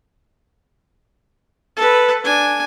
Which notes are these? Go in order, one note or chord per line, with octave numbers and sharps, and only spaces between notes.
A4 B4
D4 G#5